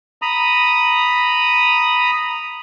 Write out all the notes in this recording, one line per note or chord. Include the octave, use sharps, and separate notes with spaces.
A#5 B5 D#6